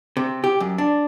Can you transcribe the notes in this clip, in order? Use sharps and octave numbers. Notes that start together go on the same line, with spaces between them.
C3
G4
F#2
D4